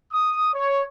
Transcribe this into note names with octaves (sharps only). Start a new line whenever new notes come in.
D#6
C#5